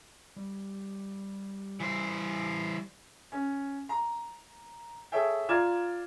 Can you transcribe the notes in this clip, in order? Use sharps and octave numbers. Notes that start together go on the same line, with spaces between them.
G3
E3 C5
C#4
A#5
G#4 A4 C#5 E5 G5
F4 D5 A#5 F6 G#6 E7